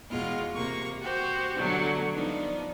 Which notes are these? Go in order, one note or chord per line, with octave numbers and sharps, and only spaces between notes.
E2 B2 G#3 F4 F6
C3 A#3 A#5 C#6
F#4 G4 C5
B2 D3 F#3 G3 A3
F3 B3 D4 D#4